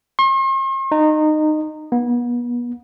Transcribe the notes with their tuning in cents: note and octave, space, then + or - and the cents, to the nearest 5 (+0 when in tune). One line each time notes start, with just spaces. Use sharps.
C6 +45
D#4 -20
B3 -35